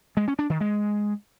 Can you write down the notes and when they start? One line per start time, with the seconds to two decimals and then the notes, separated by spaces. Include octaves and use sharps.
0.17 G#3
0.28 C#4
0.39 D4
0.50 D#3
0.61 G#3